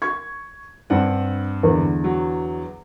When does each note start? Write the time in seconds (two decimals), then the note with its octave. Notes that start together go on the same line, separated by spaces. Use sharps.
0.02 C#6 G#6
0.90 G2 C4 D4 F#5
1.63 E2 D3
2.04 F#3